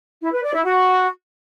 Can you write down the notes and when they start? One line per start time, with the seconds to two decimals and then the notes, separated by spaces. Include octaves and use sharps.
0.22 E4
0.32 B4
0.43 D5
0.54 E4
0.64 F#4